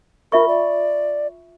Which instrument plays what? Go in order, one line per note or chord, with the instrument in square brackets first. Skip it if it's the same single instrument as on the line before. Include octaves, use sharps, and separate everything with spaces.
[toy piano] F4 E5 C#6 [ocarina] A#4
[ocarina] D5